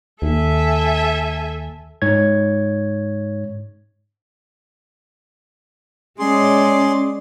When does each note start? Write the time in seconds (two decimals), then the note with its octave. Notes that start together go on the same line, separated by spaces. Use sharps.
0.22 D#2 A4 E5 G#5
2.02 G#2 C#5 G#6
6.19 G#3 C#4 G#4 D5 C6